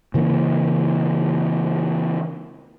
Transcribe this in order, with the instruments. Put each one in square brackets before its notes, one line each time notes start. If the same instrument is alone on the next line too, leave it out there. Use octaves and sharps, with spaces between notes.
[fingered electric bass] C#3 E3 A#3